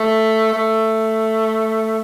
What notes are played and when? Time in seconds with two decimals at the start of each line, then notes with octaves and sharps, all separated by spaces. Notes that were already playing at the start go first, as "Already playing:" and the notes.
Already playing: A3
0.53 A3